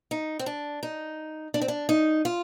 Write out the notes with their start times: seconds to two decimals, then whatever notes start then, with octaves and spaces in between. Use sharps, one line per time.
0.11 D#4
0.39 C4
0.46 D4
0.83 D#4
1.54 D4
1.61 C4
1.68 D4
1.89 D#4
2.25 F4